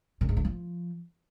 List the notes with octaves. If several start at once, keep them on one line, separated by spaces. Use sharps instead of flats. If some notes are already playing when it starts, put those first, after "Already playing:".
A#2
G#2
D3
F3